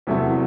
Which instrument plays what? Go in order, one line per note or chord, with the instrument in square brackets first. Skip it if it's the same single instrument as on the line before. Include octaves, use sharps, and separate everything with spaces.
[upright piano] E2 C3 F#3 A3 E4